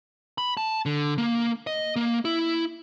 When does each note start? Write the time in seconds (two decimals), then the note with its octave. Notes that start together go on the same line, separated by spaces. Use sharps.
0.38 B5
0.57 A5
0.86 D3
1.18 A#3
1.67 D#5
1.96 A#3
2.25 E4